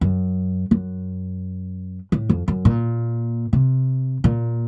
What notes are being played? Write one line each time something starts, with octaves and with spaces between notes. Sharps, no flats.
F#2
F#2
A2
F2
F#2
A#2
C3
A#2